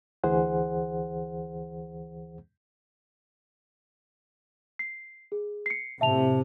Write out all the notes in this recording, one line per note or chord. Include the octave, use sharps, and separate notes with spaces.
D2 E3 G#4 C5 F#5
C7
G#4
C7 C#7
A2 C3 E5 A5 F7